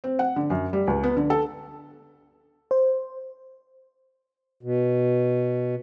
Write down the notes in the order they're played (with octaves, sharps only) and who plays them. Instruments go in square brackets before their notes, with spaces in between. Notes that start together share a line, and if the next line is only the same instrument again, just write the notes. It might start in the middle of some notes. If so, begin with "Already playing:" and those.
[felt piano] C4
F#5
D3
F#2
G3
C#2
B3
D3
A4
[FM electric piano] C5
[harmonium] B2